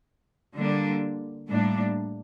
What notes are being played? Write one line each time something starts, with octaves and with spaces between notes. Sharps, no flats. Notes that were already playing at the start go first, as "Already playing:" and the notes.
D3 G3 A#3 D4
A2 G3 A#3 D4